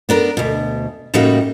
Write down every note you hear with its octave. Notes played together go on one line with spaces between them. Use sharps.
B3 D4 A#4
D2 B2
A2 C#3 G3 A#3 D#4 F#4